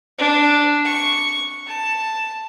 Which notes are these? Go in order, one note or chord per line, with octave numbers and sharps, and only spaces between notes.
D4
C#6
A5